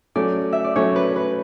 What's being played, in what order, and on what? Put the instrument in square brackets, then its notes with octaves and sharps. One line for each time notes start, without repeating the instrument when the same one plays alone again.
[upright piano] F#3 A3 C#4 [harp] D5
[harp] E5
D5
[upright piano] F#3 A3 C#4 [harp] C#5
[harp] B4
B4